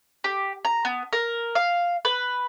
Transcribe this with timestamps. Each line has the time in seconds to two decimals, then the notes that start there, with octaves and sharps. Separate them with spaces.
0.24 G4
0.65 A#5
0.85 B3
1.13 A#4
1.55 F5
2.05 B4